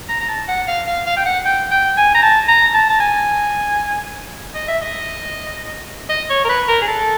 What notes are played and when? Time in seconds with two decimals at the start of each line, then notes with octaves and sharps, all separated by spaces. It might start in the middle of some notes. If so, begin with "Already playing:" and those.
0.09 A#5
0.21 A#5
0.29 A5
0.48 F#5
0.68 F5
0.87 F5
1.06 F5
1.17 G5
1.26 F#5
1.45 G5
1.71 G5
1.97 G#5
2.15 A#5
2.23 A5
2.48 A#5
2.74 A5
2.90 A5
3.00 G#5
4.55 D#5
4.68 E5
4.82 D#5
6.10 D#5
6.30 C#5
6.45 A#4
6.49 B4
6.68 A#4
6.82 G#4
6.88 A4